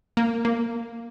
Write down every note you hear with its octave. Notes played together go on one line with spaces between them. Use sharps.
A#3
A#3